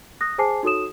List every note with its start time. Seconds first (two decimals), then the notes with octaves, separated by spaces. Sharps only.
0.21 D#6 F#6 A#6
0.38 G#4 C5 G#5 A5 D6 C7
0.63 D#4 F#4 A4 C#5 D#6 E7